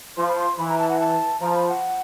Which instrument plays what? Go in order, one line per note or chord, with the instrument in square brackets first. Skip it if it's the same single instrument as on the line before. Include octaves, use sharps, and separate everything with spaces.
[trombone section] F3 [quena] C6
[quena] B5
C6
[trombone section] E3 [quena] B5
[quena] A#5
A5
F#5
A5
[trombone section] F3 [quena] A#5
[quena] B5
F#5